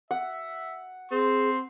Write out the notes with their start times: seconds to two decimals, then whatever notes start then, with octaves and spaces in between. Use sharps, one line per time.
0.11 E5 F#5
1.11 C4 G#4 C6